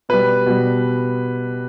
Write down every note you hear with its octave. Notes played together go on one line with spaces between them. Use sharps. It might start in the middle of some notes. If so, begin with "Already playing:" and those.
B2 G3 B4
B2 G3